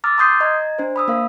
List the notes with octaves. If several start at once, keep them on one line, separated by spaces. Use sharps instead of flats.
A#5 D6 E6 F6 A6
A#5 C6 D#6 G6 C7
D#5 A#5 G#6
D4 C5
B5 D#6 E6
A#3 A#4 F5